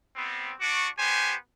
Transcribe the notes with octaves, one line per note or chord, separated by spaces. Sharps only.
G3 B3 C4
D4 F#4 C#6 D6
B3 G4 C5 G#5